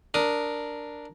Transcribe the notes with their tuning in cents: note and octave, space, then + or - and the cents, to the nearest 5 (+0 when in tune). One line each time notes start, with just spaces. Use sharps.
D4 +0 A#4 +0 D#6 +0